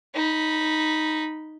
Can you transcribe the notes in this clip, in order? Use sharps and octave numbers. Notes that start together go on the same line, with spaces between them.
D#4 B5